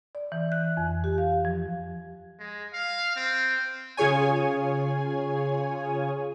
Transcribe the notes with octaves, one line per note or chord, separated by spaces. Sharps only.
D5
E3
F#6
F2
G4
F5
F3
G#3
F5
C4
C#3 F4 G#4 C#5 G#5